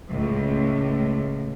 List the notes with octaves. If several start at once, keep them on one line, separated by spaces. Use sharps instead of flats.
C#2 A2